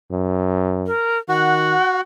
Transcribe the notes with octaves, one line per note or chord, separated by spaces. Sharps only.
F#2
A#4
D#3 F#4 F#5